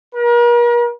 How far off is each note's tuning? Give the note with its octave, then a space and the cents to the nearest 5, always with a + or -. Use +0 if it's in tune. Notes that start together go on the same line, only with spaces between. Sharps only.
A#4 +40